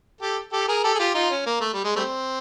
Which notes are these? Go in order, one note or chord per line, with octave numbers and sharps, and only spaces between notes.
G4 A4
G4 A4
G#4 A#4
G4 A4
G#4
F4 G4
D#4 F4
C#4
A#3
A3
G3
G#3
G3 A3 C4